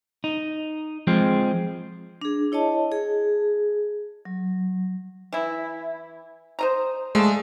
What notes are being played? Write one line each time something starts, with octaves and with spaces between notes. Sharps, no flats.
D#4
F3 G#3 C4
D4 G#4
E4 C#5 D#5 A5
G#4
F#3
E3 E4
C5 D#5 A#5
G#3 A3 D5 F5 A5